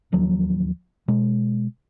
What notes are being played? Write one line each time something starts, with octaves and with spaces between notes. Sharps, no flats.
D1 D#2 F3 F#3
B2 G#3